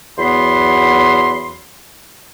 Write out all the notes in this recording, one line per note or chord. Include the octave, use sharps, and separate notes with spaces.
E2 F#3 B3 B5 C6